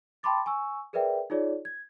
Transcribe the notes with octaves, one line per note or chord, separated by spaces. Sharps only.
G5 A5 B5 C6 D6 A6
G#5 C#6 E6
G#4 A#4 B4 D5 E5 G5
D#4 F4 G#4 C#5 D5
G#6